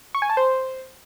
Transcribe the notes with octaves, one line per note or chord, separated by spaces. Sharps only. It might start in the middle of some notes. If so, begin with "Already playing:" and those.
C#6
G#5
A5
C5